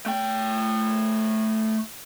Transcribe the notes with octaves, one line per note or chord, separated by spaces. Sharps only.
A3 G5